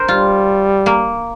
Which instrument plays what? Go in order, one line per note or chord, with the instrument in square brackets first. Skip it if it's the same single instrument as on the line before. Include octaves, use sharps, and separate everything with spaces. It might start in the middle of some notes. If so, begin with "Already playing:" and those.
Already playing: [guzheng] A#4 C5
[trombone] G3 [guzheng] F4
[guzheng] A#3